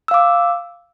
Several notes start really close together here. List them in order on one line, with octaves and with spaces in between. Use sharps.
E6 F5 D6